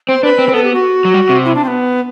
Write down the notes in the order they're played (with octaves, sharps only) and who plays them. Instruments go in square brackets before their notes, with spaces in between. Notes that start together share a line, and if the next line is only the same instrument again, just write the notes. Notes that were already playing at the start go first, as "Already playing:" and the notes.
[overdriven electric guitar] C4 [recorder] C5
[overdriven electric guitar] D4 [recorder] B4
[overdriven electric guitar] C4
C4
[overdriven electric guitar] B3 [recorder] A4
[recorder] G4
F#4
[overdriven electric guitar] F#3
G3
C3
[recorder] E4
D4
C4
B3